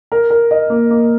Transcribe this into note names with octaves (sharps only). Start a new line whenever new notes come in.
A#4
A#4
D#5
A#3
A#3